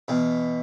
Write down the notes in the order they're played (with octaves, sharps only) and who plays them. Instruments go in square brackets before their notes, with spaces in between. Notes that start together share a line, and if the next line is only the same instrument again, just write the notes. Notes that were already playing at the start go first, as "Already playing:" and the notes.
[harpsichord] E2 B2